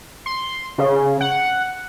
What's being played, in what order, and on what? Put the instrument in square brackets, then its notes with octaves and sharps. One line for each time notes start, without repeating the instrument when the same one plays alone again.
[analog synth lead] C6
C#3
F#5